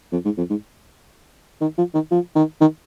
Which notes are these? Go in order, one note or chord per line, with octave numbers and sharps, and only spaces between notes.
F2
G#2
F2
G#2
D#3
F3
D#3
F3
D#3
D#3